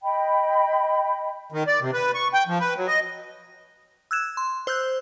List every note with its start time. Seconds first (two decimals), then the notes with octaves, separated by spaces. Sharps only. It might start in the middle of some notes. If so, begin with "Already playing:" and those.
0.02 D#5 G5 B5
1.52 D#3
1.67 D5
1.81 C3
1.93 B4
2.15 C#6
2.34 G5
2.47 F3
2.60 B4
2.76 F#3
2.88 D#5
4.11 E6 F#6 G#6 E7
4.37 C6
4.67 C5 E6 F#6 G6